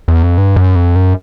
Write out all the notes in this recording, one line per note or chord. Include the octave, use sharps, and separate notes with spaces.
E2
F2
G2
F#2
F2
F#2